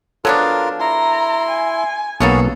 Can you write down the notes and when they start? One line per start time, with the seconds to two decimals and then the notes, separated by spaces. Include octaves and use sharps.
0.25 F#3 B3 D4 F4 A4 A#4
0.80 E4 A#5 C6
1.49 G#5
2.20 B1 A3 A#3 C#4 F#4 G#4 A4 B4